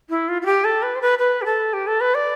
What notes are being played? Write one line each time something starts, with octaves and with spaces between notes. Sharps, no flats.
E4
F4
F4
G4
A4
B4
C5
B4
B4
G4
A4
G4
A4
B4
D5